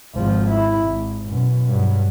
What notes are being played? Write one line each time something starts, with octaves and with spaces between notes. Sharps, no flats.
G#1 F3
E4
G#1
F#2 B2
G2 F#3